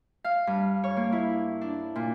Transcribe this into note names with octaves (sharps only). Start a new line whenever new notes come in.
F5
G2
C#5
A#3
E4
D4
A#2